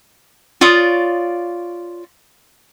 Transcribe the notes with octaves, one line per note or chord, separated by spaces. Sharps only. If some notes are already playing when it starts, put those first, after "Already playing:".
F4 C#5 D5 D#6